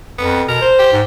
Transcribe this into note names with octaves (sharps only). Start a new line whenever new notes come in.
F2 B3
B2 A#4
C5
G4
G#2